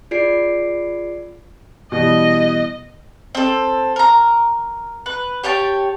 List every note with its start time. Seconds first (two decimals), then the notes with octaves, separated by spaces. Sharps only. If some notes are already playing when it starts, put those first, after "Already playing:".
0.11 F4 G#4 D5 C7 D7
1.92 B2 E3 G3 D#5
3.35 C4 A4
3.96 A#4 A#5
5.06 B4
5.44 G4 C#5 G5 A5